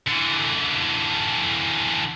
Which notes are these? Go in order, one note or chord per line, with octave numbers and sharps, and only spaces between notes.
D3 E3